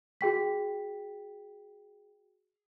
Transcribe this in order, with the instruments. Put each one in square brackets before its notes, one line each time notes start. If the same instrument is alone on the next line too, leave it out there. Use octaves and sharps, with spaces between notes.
[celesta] F#4 G#4 G5 B6